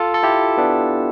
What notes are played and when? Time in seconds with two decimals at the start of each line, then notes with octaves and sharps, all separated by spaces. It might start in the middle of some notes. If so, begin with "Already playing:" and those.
Already playing: F4 A4
0.14 A4
0.23 E4 G4
0.58 B3 D4